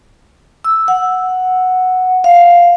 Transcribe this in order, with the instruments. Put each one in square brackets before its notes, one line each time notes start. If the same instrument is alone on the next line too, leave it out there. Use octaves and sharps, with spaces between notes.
[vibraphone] E6
F#5
F5